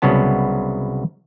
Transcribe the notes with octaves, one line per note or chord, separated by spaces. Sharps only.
C2 C#3 F#3 B3 A5